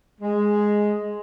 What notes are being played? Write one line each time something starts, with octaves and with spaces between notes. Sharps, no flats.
G#3